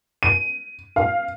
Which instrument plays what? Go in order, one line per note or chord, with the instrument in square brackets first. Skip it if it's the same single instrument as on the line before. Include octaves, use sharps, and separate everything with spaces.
[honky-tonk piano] D#7
F5